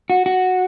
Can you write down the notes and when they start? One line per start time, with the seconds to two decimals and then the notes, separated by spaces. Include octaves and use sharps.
0.10 F#4
0.26 F#4